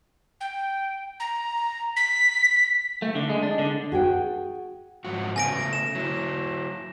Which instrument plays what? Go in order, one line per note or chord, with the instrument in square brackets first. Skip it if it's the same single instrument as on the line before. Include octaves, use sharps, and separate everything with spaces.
[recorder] G5
A#5
B6
[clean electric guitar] A3
D3
G#3
D4
D3
[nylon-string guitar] F#4 G#4 G5
[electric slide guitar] G#2 F3 F#4
[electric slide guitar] C#3 A3 B3 [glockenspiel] G#5 A#6 D7
[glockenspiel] E7
[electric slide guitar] F#3 E4